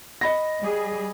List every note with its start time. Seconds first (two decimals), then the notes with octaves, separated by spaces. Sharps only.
0.21 D#5 B5 A#6
0.63 G3 G#4